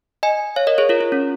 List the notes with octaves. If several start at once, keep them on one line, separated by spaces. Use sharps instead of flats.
D#5 G#5
C#5 F5
A#4 D#5
G#4 C#5
F4 A#4
F4
C#4